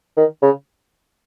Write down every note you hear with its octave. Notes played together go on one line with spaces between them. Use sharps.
D#3
C#3